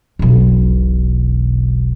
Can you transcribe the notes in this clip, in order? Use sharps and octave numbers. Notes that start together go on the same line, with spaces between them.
E1 B1